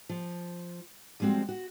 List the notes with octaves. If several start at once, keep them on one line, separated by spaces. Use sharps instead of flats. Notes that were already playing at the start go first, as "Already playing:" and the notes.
F3
F3 G3 G#3 C4 F#4
F#4